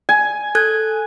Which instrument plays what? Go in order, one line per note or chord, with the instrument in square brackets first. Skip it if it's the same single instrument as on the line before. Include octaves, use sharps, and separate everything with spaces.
[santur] G#5
[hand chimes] A4 F#6 G#6